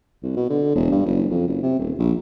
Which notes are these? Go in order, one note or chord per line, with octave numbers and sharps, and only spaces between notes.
C2
B2
D3
E1
G2
F#1
F2
F#1
C3
D#1
A#1